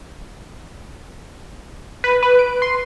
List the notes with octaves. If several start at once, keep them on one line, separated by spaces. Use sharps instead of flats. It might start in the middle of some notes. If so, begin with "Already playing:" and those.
B4
B4
D7
C6